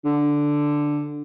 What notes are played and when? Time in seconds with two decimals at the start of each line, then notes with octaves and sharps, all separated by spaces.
0.05 D3